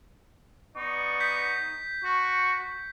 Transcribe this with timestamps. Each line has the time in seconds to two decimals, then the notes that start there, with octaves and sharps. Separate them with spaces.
0.77 B3 D#4 D5 C#6
1.20 G6 B6
2.04 F#4 C#6